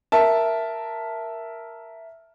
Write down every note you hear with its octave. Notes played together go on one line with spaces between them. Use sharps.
A#4 E5 A5